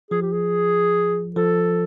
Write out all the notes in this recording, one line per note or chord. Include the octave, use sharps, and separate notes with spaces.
F3 G#4
G4
G#4
F3 A4